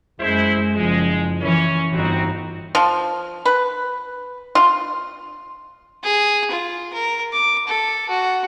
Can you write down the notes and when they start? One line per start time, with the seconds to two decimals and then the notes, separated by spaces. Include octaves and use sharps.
0.20 F#2 G#3 E4 C5
0.75 F#1 F3 G#3
1.42 E3 C#4
1.93 G1 C4 D#4 F#4
2.75 F3
3.45 B4
4.55 F4
6.04 G#4
6.51 F4
6.93 A#4
7.33 D6
7.67 A4
8.09 F#4